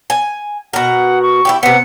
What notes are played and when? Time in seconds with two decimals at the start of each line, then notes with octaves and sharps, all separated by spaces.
0.10 G#5
0.73 B2 A#4 F#5
1.22 C#6
1.45 E4 F#4 G4
1.63 C3 B3 C#7